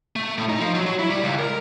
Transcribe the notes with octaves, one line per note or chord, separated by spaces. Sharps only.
A3
A2
D#4
F3
F#3
F#3
E4
G3
C#2
A#4